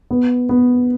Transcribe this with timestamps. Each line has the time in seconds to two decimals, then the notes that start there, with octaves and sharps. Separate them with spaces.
0.11 B3
0.49 B3